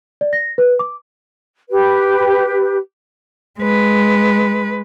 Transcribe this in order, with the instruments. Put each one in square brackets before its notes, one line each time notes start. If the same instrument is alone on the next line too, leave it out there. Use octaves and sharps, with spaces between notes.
[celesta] D5
A#6
B4
D6
[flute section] G4 B4
[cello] G#3 B4